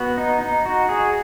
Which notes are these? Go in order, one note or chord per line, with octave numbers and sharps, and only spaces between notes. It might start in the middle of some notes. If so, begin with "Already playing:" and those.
Already playing: B3 F#4
D#4
D#4
F#4
G#4